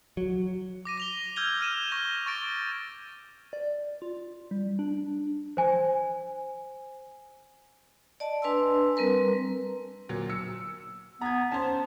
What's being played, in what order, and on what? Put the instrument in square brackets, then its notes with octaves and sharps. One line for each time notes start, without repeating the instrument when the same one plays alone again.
[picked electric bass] F#3
[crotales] D6 A#6 D#7
A#6 F7 G7
E6 F6 G6 G#6 F7 G7
F6 D#7 E7
C#6 A#6 G7
C#6 A6 D7
[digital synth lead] D5
F4
G3
D4
[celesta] C5 G#5
[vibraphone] D5 D#5 A5
D4 B4 G#5 A5 C6 E6
G3 C4 A#4 B4 A#5
[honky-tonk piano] A#2 F#3
E6 C#7
[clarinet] B3 [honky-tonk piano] A#5 G#6
[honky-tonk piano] C#4 C5 [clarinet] A5